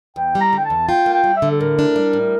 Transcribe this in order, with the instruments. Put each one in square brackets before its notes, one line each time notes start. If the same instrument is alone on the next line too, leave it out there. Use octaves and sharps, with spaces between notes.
[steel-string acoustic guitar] E2 [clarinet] G5
[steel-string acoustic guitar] G3
[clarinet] A#5
[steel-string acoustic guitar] D3 [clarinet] G5
[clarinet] A5
[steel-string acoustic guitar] E2
[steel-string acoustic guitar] F4 [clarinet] G5
[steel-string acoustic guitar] A#3
[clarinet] G5
[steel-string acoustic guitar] G3
[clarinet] E5
[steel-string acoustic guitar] D3
[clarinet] A4
[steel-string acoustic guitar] A2 [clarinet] A#4
[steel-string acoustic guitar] D4
G3
A2